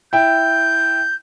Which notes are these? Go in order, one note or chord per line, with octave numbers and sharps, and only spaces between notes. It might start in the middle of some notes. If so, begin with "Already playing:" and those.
E4 G5 G6